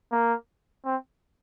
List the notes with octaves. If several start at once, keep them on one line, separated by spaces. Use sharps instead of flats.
A#3
C4